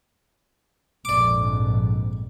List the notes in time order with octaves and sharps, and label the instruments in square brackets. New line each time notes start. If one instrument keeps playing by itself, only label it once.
[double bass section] A#1 F2 G#2 [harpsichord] D5 D6